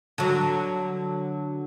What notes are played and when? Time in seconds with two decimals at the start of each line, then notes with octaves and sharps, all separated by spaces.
0.18 D3 F#3